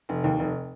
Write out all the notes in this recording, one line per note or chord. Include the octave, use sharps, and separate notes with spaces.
F1
D#2
F1